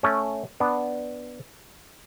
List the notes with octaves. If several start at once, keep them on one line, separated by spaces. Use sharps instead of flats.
A3 C#4
B3 D4